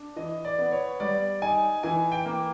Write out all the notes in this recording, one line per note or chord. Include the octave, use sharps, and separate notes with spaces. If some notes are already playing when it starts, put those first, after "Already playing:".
Already playing: D4
E3 D#5
D5
B3
C#5
G3 D5
D#4 G#5
E3 G#5
G5
A#3